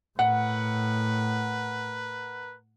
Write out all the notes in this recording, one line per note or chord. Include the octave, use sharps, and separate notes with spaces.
A2 A#4 B4 F#5